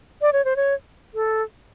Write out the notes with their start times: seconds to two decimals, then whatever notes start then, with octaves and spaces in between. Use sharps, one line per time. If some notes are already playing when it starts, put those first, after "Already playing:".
0.22 D5
0.33 C#5
0.45 C5
0.56 C#5
1.15 A4